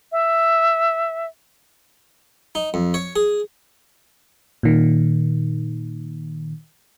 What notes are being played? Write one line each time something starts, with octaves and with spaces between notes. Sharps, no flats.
E5
D#4
F2
C#5
G#4
A#2 D#3